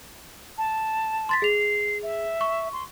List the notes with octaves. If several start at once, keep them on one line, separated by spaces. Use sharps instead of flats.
A5
C6 A6 B6
G#4 C7 F7
E5
C#6
C6